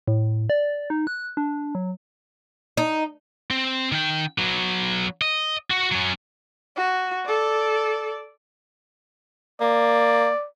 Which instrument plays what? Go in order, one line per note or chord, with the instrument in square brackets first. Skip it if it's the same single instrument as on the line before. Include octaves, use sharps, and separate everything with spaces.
[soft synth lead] A2
D5
D#4
F#6
D4
F#3
[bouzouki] D#4
[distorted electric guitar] C4
D#3 G5
F#3 B3
D#5
F#4
F#3 C#4
[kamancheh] F#4
A4 D5
[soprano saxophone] A#3 [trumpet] D5